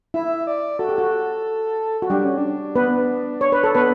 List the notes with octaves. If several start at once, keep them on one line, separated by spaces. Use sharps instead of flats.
E4 E5
D5
F#4 A4
G4
F#4
F#4
G3 D4 G4
C#4
D4
B3 B4
C#5
B4
A4
B3 B4